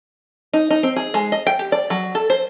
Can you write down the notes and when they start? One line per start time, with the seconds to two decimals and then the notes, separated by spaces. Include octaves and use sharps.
0.53 D#4
0.71 D#4
0.83 C4
0.96 G#4
1.14 G#3
1.32 D#5
1.47 G5
1.59 G4
1.72 D5
1.90 F#3
2.15 A4
2.30 C5